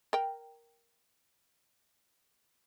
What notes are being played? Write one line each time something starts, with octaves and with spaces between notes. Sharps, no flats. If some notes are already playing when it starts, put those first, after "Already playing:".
A#4 G5